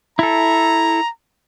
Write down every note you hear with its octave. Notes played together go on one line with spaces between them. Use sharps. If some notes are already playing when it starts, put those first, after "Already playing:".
E4 A4 A#5